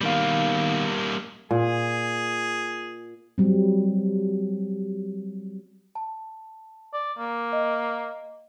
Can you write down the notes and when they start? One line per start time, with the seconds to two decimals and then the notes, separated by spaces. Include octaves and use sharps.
0.01 B2 D#3 G3 A#3 F5
1.51 A#2 G#4
3.38 F#3 G3 C4
5.95 A5
6.93 D5
7.19 A#3
7.53 D#5